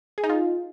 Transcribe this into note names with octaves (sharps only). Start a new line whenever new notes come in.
G#4
D#4
F4